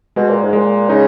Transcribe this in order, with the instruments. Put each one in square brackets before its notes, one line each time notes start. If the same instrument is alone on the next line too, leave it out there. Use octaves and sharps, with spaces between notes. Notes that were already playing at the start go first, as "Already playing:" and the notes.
[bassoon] B2 [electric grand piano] G#3
[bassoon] A#2
G#2
[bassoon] A#2 [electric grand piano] G#3
[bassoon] C#3 [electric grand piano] D#4